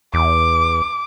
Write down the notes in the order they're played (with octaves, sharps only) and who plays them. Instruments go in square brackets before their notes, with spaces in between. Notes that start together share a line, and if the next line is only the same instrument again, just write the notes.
[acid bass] E2 [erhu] D6